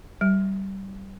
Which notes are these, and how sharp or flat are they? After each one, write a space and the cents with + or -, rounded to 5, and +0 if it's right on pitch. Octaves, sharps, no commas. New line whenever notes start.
G3 -20